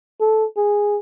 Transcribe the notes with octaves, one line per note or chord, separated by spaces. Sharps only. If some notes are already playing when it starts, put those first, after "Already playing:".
A4
G#4